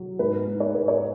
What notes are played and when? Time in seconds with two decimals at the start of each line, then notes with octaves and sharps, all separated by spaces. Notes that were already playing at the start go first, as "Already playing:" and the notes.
Already playing: F#3
0.19 G#2 B4
0.47 G#2
0.60 C#5
0.74 G#2 B4
0.88 C#5